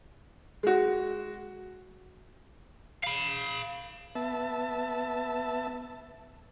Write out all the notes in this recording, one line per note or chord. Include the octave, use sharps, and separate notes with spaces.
G#3 F#4
F5 B5
B3 E5 A5